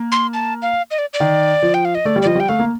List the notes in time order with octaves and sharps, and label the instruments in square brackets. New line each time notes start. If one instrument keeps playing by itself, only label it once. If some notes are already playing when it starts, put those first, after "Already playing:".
Already playing: [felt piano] A#3
[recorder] C6
A5
F5
D#5
D5
D5
[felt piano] D#3
F3
[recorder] G5
F5
D#5
[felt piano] A3 [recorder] D5
[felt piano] G3
[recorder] D5
[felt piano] F3 [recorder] D#5
[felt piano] G3
[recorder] G5
[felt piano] A3 [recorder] F5
[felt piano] A#3